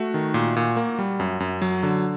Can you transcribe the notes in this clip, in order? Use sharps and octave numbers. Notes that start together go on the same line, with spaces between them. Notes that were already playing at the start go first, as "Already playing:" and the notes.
Already playing: A3 F#4
D#3
A#2
A#2
A#3
G3
F#2
F#2
F#3
D3